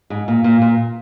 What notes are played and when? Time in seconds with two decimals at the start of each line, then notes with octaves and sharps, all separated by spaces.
0.10 G#2
0.28 A#2
0.44 A#2
0.62 A#2